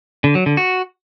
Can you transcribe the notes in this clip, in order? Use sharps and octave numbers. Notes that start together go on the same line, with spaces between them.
D3
F#3
D3
F#4